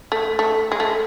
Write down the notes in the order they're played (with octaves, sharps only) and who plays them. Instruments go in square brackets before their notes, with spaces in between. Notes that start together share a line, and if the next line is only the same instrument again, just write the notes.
[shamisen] A3
A3
G#3
A3